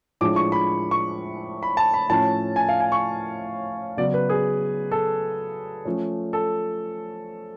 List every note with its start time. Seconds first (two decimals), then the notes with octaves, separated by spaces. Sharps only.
0.21 A2 F3 G#3 D4 D6
0.36 C#6
0.52 B5
0.91 C#6
1.63 B5
1.77 A5
1.94 B5
2.10 A2 F3 A3 C#4 A5
2.56 G#5
2.69 F5
2.80 G#5
2.92 C#6
3.97 C#3 F#3 B3 D5
4.14 B4
4.30 G#4
4.91 A4
5.85 F3 A3 C#4
6.33 A4